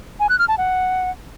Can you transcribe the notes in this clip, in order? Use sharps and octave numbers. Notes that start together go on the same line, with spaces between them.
G#5
F#6
F6
A5
F#5